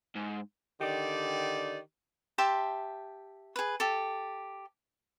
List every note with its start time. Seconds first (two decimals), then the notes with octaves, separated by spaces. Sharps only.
0.15 G#2
0.80 D3 D#3 G4 D5
2.38 G4 E5 A5 C6
3.56 G#4 B4
3.80 G4 A4